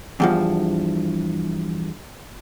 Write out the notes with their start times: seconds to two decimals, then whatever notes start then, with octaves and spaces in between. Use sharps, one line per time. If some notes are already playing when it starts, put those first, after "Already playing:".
0.20 E2 G2 F3